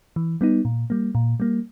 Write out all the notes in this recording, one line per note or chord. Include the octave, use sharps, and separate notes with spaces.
E3
G3 B3 D#4
A#2
G3 A#3
A#2
G3 A#3